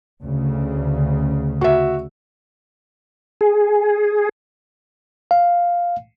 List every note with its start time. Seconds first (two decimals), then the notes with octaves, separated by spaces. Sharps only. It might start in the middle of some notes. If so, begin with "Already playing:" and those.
0.21 D2 C#3
1.61 F#4 E5
3.41 G#4
5.31 F5